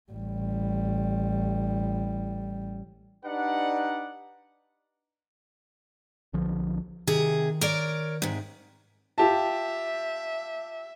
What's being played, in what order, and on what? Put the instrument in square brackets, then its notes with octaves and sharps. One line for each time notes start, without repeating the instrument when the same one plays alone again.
[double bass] A1 G3
[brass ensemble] D4 D#4 G4 B4 D5 F#5
[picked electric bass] B1 D3 F3
[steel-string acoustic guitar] C3 G#4 [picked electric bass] D#3
[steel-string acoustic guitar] A#4 C#5 D5
G#2 C3
[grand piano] F4 G4 A5 [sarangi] E5